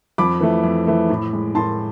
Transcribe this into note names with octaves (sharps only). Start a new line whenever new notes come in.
F2 B5 D6
E3 A3
F2
E3 A3
A2
G#3
A2 A5 C6